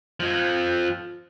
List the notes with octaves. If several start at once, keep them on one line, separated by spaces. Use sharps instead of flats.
F2 F3